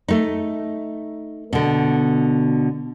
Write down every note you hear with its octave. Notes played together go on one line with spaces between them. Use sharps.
A3 D#4
B2 D3